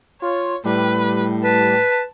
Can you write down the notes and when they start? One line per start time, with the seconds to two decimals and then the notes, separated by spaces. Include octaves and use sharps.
0.22 F4 C#5
0.65 A2 G3 B4
1.44 B4 A5